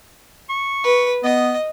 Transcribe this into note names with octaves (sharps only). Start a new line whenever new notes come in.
C#6
B4
B3 D#5